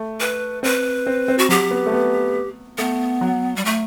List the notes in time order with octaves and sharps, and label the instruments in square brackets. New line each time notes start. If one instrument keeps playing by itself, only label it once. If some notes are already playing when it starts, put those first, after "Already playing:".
Already playing: [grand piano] A3
[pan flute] B4
[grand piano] C4 [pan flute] B4
[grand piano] C4
C4
[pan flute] F#4
[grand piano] F#3 [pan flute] G4
[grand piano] B3
A3
B3
[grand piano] A3 [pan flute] B3
[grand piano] F#3
[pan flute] G3
A3